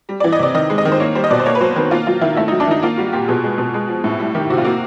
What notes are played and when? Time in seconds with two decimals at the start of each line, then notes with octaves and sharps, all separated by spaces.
0.09 G3
0.20 E3 D5
0.32 D#5
0.39 C3 D5
0.54 D#3 D#5
0.70 G#3
0.78 D#5
0.85 D#3
0.92 C5
1.00 A#3 C#5
1.15 G3 C5
1.24 D#5
1.30 B2 D5
1.40 C5
1.46 A#3 C#5
1.55 B4
1.61 F#3 C5
1.76 D#3 B4
1.91 A#3 F4
2.07 F#3 F4
2.21 D#3 E4
2.37 A3 E4
2.48 F#3 D#4
2.60 D4
2.67 D#3 D#4
2.82 A#3 F4
2.97 G3 F#4
3.13 A#2 G4
3.28 B2 G#4
3.44 G#3
3.58 B2
3.74 G#3
3.89 F3
4.04 A2
4.19 G3
4.34 D#3 G4
4.50 C3 F#4
4.58 F4
4.64 A#3 F#4